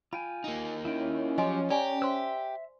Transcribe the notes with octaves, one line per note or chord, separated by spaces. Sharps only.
F4 G5 G#5 B5
A#3 D#4
C#4 E4 F4 G5
F3 F#3 G4 D#5 G#5 C6
G4 D5 G#5 A#5
C5 E5 C6 E6